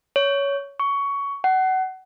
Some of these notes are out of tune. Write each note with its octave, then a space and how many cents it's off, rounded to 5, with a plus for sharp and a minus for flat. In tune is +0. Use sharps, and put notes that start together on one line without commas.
C#5 +15
C#6 +15
F#5 +25